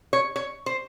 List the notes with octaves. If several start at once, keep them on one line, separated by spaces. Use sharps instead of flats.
C#5
C#5
C5